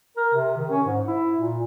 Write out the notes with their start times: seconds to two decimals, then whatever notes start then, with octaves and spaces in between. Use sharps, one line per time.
0.17 A#4
0.34 C3
0.57 D#3
0.70 C#4
0.85 G#2
1.07 E4
1.36 A#2